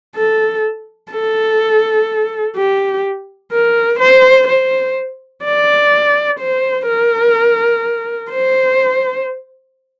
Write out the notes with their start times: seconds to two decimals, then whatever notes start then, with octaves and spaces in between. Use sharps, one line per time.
0.16 A4
1.12 A4
2.56 G4
3.52 A#4
3.99 C5
4.47 C5
5.44 D5
6.40 C5
6.87 A#4
8.31 C5